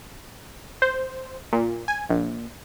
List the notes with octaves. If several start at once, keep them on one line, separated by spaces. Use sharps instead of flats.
C5
A#2
G#5
A#1